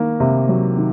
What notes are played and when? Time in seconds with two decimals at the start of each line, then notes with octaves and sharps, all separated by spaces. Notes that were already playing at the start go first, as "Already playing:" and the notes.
Already playing: D#3 A#3
0.20 C3
0.49 F#3
0.77 D#3